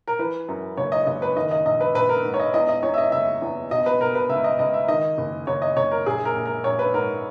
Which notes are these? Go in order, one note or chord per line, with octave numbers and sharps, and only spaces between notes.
A#4
E3 B4
F#2
F#1 C#5
D#5
F#1 D#5
B4
D#3 D#5
D#5
A#1 D#5
B4
A#1 B4
A#4
G#2
C#5
D#5
E2 D#5
D#5
E2 C#5
E5
D#5
F#1 E5
E2
B2 D#5
B4
B2 A#4
B4
C#2 E5
D#5
C#2 D#5
E5
D#3 D#5
F#1
F#1 C#5
D#5
F#1 C#5
A#4
A#1 G#4
A#4
A#1
A#4
A#1 C#5
B4
G#2 A#4